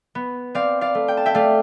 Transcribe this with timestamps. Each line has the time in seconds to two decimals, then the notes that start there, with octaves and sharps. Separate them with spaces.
0.15 B3
0.55 C4 D5 F5
0.81 D5 F5
0.95 A3
1.08 G5
1.17 A5
1.26 E5 G5
1.34 A3 D5 F5